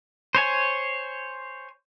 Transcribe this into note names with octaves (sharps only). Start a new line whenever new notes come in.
C5 C#5 G#5